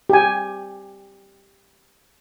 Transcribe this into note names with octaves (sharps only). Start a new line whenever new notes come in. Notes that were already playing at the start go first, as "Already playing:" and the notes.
G4 G#5